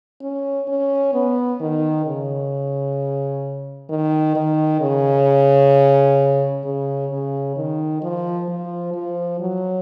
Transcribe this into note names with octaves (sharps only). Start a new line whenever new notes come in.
C#4
C#4
B3
D#3
C#3
D#3
D#3
C#3
C#3
C#3
D#3
F3
F3
F3
F#3